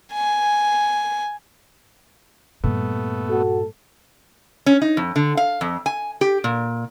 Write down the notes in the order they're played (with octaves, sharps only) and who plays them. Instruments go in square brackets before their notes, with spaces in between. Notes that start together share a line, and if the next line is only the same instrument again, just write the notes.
[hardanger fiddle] G#5
[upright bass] G2 A#2 [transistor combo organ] A3 B3
[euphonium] F#4 [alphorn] A4
[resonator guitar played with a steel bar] C#4
D#4
F2
D3
F5
F2
G#5
G4
A#2